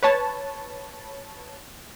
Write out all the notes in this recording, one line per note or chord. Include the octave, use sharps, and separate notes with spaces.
B4 C#5 A5